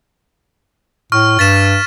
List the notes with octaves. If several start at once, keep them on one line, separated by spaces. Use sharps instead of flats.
A2 C#6 F6
G2 A6 B6 E7